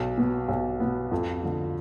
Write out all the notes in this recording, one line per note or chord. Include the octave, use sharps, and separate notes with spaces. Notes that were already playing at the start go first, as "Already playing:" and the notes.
Already playing: B1
B2 B3
B1
B2 B3
F2
D3 F3